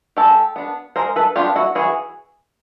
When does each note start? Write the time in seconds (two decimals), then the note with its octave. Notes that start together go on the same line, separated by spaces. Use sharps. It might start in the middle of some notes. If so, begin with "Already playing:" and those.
0.17 G#3 G4 A4
0.56 B3 D4
0.96 G#3 A#4 C5
1.16 A4 B4
1.36 B3 D4 F4 G4
1.55 E4 F#4
1.75 E3 F#4 G#4